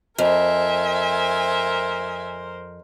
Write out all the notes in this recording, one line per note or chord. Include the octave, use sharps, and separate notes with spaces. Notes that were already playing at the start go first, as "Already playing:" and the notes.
F2 A#4 C5 E5 G#5